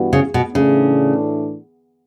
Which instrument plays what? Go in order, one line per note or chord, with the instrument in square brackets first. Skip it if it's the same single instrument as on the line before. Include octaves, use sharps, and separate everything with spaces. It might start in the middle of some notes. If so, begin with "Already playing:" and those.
Already playing: [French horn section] G2 E3 B3 F#4
[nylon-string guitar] C#3
B2
[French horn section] A2 E3 A3 D4 [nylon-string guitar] C#3